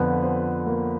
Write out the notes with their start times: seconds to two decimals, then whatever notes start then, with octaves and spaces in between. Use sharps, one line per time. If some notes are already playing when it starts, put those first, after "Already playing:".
Already playing: F2 D3 F3 B3 B4
0.22 C4 C5
0.67 A#3 A#4